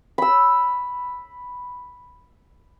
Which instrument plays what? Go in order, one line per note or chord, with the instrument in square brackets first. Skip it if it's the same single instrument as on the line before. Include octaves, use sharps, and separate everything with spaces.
[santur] B5 E6